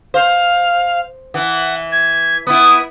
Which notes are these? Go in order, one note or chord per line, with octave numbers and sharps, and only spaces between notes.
C5 F5
E3 F#5
G#6
B3 E4 D#6